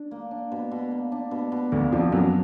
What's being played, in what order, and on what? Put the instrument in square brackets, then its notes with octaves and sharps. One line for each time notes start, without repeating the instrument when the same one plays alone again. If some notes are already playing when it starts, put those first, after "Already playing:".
Already playing: [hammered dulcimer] D4
A#3
D4
B2
B2
A#3
D4
B2
B2
[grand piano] D2 D3 [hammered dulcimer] A#3
[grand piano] F2 F3 [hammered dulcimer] D4
[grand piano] F#2 F#3 [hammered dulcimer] B2